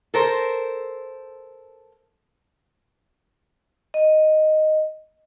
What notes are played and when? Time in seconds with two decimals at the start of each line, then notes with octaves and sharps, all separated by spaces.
0.14 A4 A#4 C5
3.94 D#5